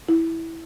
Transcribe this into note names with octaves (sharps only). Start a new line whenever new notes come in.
E4